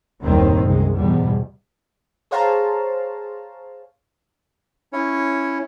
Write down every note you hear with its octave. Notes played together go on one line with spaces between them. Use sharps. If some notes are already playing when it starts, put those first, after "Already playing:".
F#1 D#2 A2 D#3 G3 C4
C2 F#2 G#3
E2 G#2 B2 G3
G#4 C5 C#5 F5 A5 A#5
C#4 E4 C#5